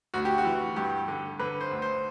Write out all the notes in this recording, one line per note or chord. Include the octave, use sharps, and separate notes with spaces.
D2 F#4
G4
F#4
E3
G2 G4
D3
D3 B4
C5
D2
C5